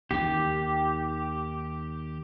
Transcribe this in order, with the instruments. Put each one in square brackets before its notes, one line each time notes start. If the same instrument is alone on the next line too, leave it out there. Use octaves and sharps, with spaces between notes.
[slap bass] D#2 D#3 [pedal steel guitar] G4